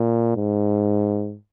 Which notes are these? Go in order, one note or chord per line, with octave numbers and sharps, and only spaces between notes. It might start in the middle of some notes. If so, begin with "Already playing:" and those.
Already playing: A#2
G#2